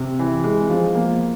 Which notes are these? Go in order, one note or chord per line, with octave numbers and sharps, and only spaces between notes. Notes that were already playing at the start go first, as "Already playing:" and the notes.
Already playing: C3
E3
G#3
F3
A#3